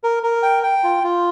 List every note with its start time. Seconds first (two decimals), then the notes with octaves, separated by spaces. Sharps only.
0.04 A#4
0.23 A#4
0.43 G5
0.63 G5
0.84 F4
1.04 F4